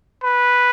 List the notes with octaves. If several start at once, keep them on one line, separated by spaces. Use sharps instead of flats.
B4